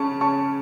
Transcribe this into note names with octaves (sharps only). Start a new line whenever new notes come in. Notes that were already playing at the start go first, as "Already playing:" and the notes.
Already playing: C#3 C#4 A5 C#6
C#4 A5 C#6